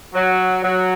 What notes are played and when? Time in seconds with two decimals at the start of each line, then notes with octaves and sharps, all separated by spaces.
0.14 F#3
0.64 F#3